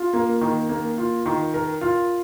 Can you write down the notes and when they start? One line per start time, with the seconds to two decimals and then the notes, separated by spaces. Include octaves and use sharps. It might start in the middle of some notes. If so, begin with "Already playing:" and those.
Already playing: F4
0.13 A#3
0.41 D#3
0.69 A#3
0.98 F4
1.26 D#3
1.54 A#4
1.81 F4